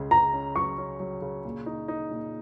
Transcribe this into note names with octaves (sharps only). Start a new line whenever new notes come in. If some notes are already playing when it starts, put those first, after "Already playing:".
Already playing: C#2 C#3
C#3 A#5
C#4
F#3 C#6
C#4
F#3
C#3
A#2
D#4
D#4
A#2